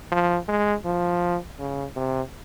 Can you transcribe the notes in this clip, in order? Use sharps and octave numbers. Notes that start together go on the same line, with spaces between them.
F3
G#3
F3
C#3
C3